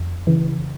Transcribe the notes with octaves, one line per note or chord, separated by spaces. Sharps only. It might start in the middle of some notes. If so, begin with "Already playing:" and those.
Already playing: F2
C#3 E3